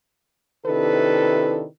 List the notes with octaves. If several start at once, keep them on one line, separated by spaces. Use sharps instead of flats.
C3 D#3 D4 E4 A4 B4